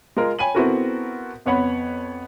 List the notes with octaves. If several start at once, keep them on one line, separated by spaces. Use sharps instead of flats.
G#3 F4 A#4
C#5 G5 G#5 B5 D#7 F#7
B3 C4 E4 F#4 A4 A#4
F2 B3 C#5 F#5 B5